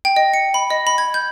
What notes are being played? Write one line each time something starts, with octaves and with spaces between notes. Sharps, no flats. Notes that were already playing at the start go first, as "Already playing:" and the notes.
G5
D#5
C#7
B5
D#5
B5
G#6
G6